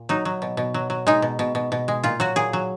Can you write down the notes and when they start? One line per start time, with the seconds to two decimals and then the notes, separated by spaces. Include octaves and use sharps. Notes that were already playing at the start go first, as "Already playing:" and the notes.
Already playing: A#2
0.09 F#3 D#4
0.25 F#3
0.42 B2
0.57 B2
0.74 F#3
0.90 F#3
1.07 G#3 D#4
1.22 B2
1.39 B2
1.55 B2
1.72 B2
1.88 G#3
2.03 A#2 F4
2.20 F#3 F#4
2.36 A#2 G#4
2.53 F#3